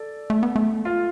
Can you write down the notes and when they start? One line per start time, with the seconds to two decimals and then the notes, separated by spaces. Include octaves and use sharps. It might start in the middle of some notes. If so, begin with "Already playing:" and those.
Already playing: A4 D5
0.30 A3
0.43 B3
0.56 A3
0.85 F4